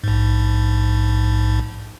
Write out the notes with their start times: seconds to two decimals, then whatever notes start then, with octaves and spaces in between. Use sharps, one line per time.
0.04 A#1 G#2